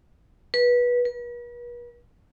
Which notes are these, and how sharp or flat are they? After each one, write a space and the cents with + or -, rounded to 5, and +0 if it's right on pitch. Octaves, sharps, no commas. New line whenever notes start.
B4 -20
B4 -45